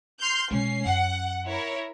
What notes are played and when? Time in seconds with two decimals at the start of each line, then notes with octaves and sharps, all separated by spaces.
0.20 C6 F6 G6
0.51 B2 G#3 C#4 C7
0.86 F#2 F#5
1.48 E4 A#4 C#5